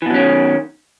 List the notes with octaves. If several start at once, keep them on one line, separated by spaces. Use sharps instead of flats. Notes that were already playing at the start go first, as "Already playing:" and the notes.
B2 D#3 E3 F#3 C#4